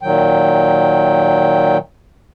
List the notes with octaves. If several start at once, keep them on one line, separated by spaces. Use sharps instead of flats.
A#2 D#3 F#3 G5